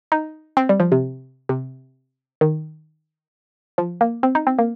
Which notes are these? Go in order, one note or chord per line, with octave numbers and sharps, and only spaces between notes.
D#4
C4
G3
F3
C3
C3
D#3
F3
A#3
C4
D#4
C4
A#3